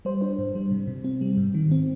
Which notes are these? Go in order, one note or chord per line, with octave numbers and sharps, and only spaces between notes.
G3 C5
D4 C5
G#2
G3
C3
C3
C4
G3
G#2
D#3
C4